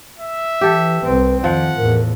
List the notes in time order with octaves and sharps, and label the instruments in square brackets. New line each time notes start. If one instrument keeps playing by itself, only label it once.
[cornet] E5
[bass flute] E3 [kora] G4 A4
[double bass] C2 C4 [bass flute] B4
[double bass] F2 [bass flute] D#3 [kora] F3 [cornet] F#5
[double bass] E2 A2 [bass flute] A#4